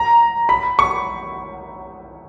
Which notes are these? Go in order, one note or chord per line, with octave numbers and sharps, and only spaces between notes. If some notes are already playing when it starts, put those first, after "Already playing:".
Already playing: A#5
B5
C#6